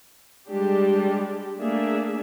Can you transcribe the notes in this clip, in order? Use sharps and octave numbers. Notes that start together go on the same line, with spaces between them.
G3 G#3 D4 G4
A3 A#3 D4 G#4 E5